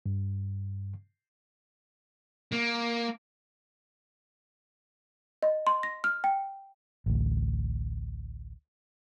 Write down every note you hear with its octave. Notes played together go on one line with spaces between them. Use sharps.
G2
A#3
D#5
C6
A#6
F6
G5
A1 D2